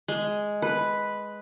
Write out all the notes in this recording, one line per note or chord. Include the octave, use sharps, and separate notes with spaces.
G#3
B4